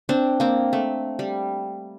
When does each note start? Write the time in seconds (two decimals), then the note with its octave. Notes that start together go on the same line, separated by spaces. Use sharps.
0.09 C4 D4
0.40 A#3 C4
0.73 A3
1.19 G3